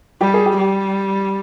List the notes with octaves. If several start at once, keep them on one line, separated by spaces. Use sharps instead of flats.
G3 G4
G#4
G4
G3